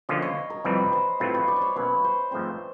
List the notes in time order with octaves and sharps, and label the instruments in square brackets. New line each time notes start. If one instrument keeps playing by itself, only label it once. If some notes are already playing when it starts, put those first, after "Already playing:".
[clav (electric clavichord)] D3 F3 A#3 C#4 F4 [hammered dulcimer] D#5
[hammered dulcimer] C#5
A#4
[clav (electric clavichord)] F2 C3 E3 G3 C4 [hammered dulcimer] B4
[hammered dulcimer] C5
[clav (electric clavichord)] A2 F#3 A3 C4 F4 [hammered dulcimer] B4
[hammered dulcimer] C#5
D5
C5
C#5
[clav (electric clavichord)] B2 F#3 A#3 C#4 [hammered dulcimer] B4
[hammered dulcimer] C5
[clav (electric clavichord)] G#2 F3 A3 C4 [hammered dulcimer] C5